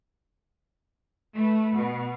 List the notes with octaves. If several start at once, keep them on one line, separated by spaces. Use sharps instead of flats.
A3 B4
B2